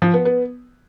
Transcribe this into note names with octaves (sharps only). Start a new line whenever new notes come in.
F3
B3
B3